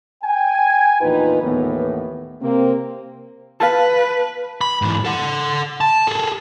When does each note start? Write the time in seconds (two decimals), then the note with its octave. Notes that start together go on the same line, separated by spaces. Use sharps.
0.23 G5 G#5
1.01 A#1 E2 D#4 F4 B4
1.43 D#2 A2 E3 B3
2.41 C3 A#3 C4
3.60 B4 F5 A5
4.61 B5
4.82 G#2 E3
5.05 A4 F#5
5.81 A5
6.07 G#4 A4